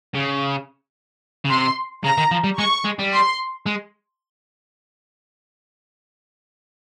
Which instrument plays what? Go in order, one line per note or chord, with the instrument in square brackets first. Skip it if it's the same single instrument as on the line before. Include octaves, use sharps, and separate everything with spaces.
[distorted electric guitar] C#3
C#3
[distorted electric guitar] C3 [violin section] C6
[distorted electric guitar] C#3 [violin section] A#5
[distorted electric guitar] D#3
F3
G3
[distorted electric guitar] G#3 [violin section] C#6
[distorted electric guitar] G#3
G3
[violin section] C6
[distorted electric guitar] G#3